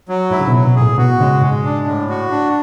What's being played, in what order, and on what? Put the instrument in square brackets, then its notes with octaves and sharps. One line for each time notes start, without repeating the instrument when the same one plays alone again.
[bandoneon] F#3
[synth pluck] G#2 [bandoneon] E4
[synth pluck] C#3
B2
[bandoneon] F#3
[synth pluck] B2
[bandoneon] G#4
[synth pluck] A2
[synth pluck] B2 [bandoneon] F#4
[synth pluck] C#3 [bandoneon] G#3
[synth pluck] G#2 [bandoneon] G#3
[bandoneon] D4
A2
F#4
D4